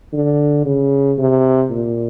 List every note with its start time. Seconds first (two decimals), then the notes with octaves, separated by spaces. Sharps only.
0.13 D3
0.66 C#3
1.18 C3
1.70 A#2